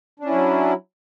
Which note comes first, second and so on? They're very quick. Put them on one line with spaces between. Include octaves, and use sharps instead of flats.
D4 C#4 E4 F#3